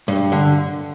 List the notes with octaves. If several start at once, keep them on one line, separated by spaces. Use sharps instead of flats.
G2
D3